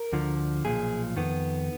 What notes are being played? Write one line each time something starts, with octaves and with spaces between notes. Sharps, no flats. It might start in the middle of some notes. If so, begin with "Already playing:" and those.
Already playing: A#4
D2 D3 F3
B1 A#2 F3 G#4
F2 D#3 B3